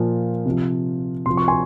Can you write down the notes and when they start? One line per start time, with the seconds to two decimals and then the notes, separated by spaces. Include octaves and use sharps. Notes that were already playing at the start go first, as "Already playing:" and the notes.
Already playing: A#2 F3
0.45 C3 F3
1.26 C3 F3 C6
1.37 C#6
1.48 G#5 C6